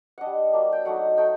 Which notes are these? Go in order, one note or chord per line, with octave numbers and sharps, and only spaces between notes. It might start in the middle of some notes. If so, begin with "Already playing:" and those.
D4 D#5 F#5
G3
F#3 A#3 D4
G5
F#3 A3 D#4 F#5
A3 D#4 G5